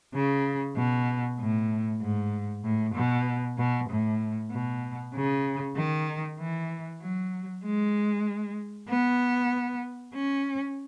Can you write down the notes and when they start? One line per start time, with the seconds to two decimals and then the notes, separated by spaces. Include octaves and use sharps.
0.14 C#3
0.76 B2
1.39 A2
2.01 G#2
2.64 A2
2.95 B2
3.58 B2
3.89 A2
4.51 B2
5.14 C#3
5.76 D#3
6.39 E3
7.01 F#3
7.64 G#3
8.89 B3
10.14 C#4